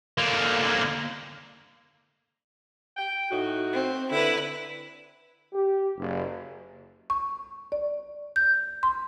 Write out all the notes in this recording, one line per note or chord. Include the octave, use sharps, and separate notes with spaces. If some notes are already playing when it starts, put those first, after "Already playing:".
D3 A#3
G5
A2 D#4 F#4
C4
D3 E4 B4
G4
F#1
C#6
D5
G6
C6